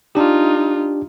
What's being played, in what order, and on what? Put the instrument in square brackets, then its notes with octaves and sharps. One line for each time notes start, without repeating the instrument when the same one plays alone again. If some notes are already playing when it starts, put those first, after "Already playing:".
[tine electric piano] D4 G4 [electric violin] D#4 F4